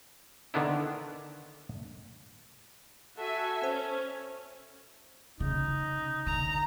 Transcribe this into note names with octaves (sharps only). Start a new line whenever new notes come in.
D3 D#3 B3 D4 E4
F#4 A4 E5 G#5
C#4 C5
C#3 D#4
D3 A#5